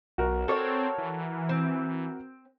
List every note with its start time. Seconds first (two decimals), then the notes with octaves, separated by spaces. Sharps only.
0.18 B1 F#4 A#4
0.48 C4 A4 C#5 D5
0.98 E3
1.49 C4